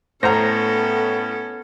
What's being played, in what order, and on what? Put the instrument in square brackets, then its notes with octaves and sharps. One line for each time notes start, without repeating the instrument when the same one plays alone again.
[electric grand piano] A2 A#6 [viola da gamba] B3 A4 [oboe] C#4 [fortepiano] C5 F#5 A#5